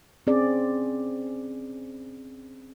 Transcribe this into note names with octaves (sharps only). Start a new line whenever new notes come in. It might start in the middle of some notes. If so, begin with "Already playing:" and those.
C4 C#4 G#4 D5